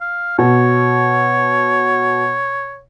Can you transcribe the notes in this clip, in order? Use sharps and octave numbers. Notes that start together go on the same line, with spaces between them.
F5
B2 C#5